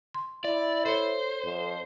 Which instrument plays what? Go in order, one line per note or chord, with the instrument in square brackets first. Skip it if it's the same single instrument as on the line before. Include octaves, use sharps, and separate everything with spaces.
[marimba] C6
[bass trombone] E4 [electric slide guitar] D5
[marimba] A4 C#5 [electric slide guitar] C5
[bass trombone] F2